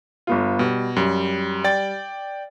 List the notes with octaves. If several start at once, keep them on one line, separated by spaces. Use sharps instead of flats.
G1 B3 F4
B2 G3
F#2 G3
D5 G5 A6